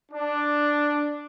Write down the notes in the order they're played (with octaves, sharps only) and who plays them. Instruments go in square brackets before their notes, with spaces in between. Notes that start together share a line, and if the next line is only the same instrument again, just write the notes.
[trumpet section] D4